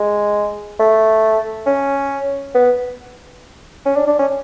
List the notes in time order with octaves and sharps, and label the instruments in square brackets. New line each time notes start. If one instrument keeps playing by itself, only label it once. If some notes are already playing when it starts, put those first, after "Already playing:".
Already playing: [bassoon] G#3
A3
C#4
B3
C#4
D4
D4
C#4